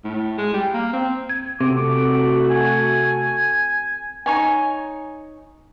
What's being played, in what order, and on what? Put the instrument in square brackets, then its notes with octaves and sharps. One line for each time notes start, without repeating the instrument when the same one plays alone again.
[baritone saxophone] A2
G#3
G3
A#3
C4
[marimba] G#6
[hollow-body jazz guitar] C3 [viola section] A3 F#4 [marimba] C4 [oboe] D6
[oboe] G#5
[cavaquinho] D#4 C#5 G#5